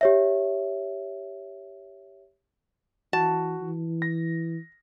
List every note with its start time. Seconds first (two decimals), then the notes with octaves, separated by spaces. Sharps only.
0.01 G4 C#5 E5
3.13 E3 F#4 A5
3.62 E3
4.02 A#6